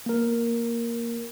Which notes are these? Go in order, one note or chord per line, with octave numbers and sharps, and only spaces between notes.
A#3 A#4